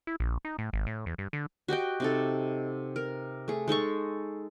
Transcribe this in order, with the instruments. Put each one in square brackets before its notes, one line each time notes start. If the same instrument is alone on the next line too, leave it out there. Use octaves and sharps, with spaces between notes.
[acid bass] E4
A#1
D#4
A2
G#1
A2
E2
G2
D3
[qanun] F#4 G4 D#5 G5
C3 D#4 A4
A#4
A3 G#4
G#3 D#4 A4 C#6